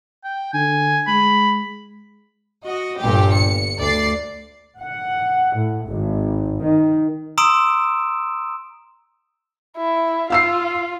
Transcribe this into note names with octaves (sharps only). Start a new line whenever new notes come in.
G5
D3 G#5
G#3 B5
F#4 D#5
G1 G2 A#2 G4
C#7
D2 D5 A6 C7
F#5
A2
G#1
D#3
A#5 C6 D#6 E6 D7 E7
E4
F4 F5 E6 C7